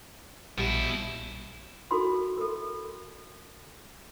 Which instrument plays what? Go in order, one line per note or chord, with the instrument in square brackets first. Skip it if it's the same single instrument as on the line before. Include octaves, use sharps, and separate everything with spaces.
[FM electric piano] A#1 G3 [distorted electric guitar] B2 E4
[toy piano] E4 F#4 A4 A#4 B5 C6
A4 A#4